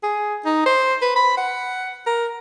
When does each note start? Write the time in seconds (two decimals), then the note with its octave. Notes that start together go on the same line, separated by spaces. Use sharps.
0.03 G#4
0.45 D#4
0.66 C5
1.02 B4
1.16 B5
1.37 F#5
2.06 A#4